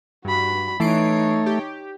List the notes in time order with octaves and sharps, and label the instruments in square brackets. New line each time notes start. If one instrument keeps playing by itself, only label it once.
[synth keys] G2 [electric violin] F#4 B5
[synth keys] E3 C7 D7 [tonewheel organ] A3 [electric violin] D#4 C#5
[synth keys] G4